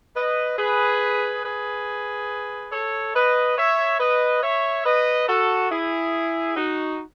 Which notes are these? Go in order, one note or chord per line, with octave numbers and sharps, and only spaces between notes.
B4 D#5
G#4 B4
G#4 B4
A4 C#5
B4 D#5
C#5 E5
B4 D#5
C#5 E5
B4 D#5
F#4 A4
E4 G#4
D#4 F#4